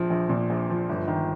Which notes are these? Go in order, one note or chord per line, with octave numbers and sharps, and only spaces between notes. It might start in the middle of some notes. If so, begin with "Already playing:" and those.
Already playing: A#1 F3
A#1
A#2
A#1
F3
G1
D#3